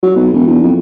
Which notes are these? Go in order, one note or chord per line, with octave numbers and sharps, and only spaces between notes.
F#3
B1
E1
E2
F2